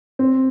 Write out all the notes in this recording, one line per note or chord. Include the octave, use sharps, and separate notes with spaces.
C4